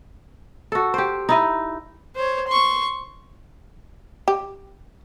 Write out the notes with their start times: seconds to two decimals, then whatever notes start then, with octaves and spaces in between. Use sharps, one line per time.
0.72 F#4 A4
0.94 G4 C5
1.29 D#4 E4 D#5
2.16 C5 C#5
2.47 C6 C#6
4.28 G4